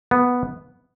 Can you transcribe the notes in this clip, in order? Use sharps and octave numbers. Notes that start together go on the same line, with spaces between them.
B3